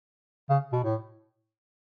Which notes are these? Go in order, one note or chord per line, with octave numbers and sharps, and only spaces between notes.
C#3
B2
A2